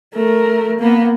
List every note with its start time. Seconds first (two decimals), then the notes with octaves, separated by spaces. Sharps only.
0.14 A3 A#4
0.80 A#3 B3